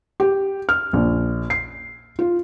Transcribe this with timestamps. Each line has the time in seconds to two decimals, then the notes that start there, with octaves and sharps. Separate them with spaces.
0.20 G4
0.69 F6
0.93 A#1
1.50 C7
2.19 F4